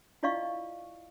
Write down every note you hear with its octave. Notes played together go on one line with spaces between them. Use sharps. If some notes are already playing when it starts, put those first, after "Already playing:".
E4 F4 D5 D#5 F5 C#6